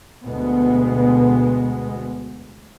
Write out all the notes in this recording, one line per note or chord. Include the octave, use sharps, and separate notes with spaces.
D2 B2 G#3 B3